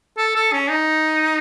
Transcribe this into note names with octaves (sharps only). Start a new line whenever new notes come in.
A4
A4
C#4
D#4